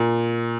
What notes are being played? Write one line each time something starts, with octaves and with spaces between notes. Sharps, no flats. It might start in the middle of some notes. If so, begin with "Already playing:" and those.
Already playing: A#2